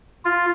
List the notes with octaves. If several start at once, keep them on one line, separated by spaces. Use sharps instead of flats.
F4